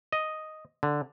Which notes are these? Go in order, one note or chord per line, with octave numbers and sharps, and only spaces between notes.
D#5
D3